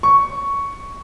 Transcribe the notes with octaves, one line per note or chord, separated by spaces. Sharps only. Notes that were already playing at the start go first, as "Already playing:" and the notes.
C#6